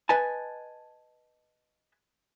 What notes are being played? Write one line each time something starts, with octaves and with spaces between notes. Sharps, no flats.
B4 D#5 G#5 A5